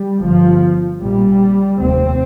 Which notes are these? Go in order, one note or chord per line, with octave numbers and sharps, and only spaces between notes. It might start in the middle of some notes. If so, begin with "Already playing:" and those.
Already playing: G3
G1 G2 F3
A#1 A#2 G3
F1 D#2 C4